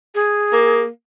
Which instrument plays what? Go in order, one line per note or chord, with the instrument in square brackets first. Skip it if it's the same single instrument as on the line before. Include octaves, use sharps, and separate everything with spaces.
[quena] G#4
[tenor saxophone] A#3